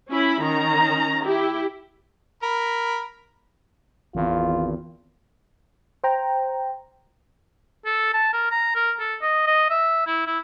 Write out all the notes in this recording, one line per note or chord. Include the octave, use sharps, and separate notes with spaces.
C#4 E4 B5
D#3 C#4 A#5
E4 G4
A#4 B5
G#1 E2 F4
C5 G5 A#5
A4
A5
A#4
A#5
A#4
A4
D#5
D#5
E5
E4
E4